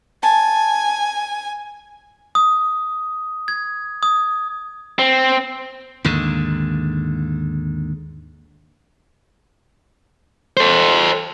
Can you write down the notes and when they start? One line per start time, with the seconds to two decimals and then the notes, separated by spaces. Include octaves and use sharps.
0.23 G#5 A5
2.35 D#6
3.48 G#6
4.03 D#6
4.99 C4
6.04 D#2 G#2 D3
10.57 A4 C5